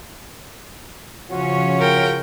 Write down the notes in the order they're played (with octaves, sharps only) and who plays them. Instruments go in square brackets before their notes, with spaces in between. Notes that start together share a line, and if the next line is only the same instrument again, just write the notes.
[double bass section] C#3 [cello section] F3 C#4 C#5 [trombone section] F4 F#4
[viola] A#4 G5